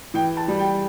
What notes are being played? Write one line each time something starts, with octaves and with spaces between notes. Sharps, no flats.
E3 G5
A5
G3
G5